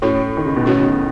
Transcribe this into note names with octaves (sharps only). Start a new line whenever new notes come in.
A2 C#4 F#4 C#5
D#3
C#3
B2
A2 C#4 F#4 C#5